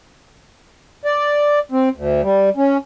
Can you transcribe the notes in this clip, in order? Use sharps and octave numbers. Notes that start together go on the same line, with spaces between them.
D5
C4
D2
G3
C#4